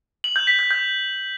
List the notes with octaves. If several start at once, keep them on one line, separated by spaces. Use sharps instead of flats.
F#7
G6
B6
G6
G6